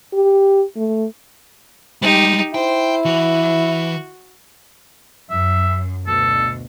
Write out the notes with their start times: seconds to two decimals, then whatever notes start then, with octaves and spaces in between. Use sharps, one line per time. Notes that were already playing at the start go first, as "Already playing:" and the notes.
0.13 G4
0.76 A3
2.02 G3 G#3 D#4 G4
2.55 E4 C5 G5
3.05 E3 F#4
5.30 F#2 E5
6.07 D2 B2 A4